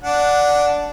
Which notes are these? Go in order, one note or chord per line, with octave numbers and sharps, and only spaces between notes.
D4 F#5